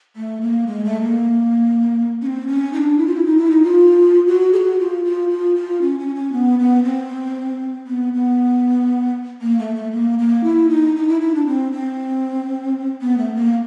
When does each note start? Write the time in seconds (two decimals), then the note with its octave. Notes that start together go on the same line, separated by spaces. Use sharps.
0.16 A3
0.41 A#3
0.67 G#3
0.85 A3
1.02 A#3
2.22 C#4
2.26 C4
2.47 C#4
2.73 D#4
2.77 D4
2.98 E4
3.07 F4
3.15 E4
3.25 D#4
3.37 E4
3.51 D#4
3.63 F4
4.27 F#4
4.53 G#4
4.57 F#4
4.79 F4
5.04 F4
5.30 F4
5.55 F4
5.82 C#4
5.99 C#4
6.15 C#4
6.32 B3
6.59 B3
6.84 C4
7.87 B3
8.13 B3
9.42 A#3
9.59 A3
9.76 A3
9.92 A#3
10.19 A#3
10.44 E4
10.69 D#4
10.96 D#4
11.08 E4
11.21 E4
11.35 D4
11.46 C4
11.72 C4
13.02 B3
13.18 A3
13.35 A#3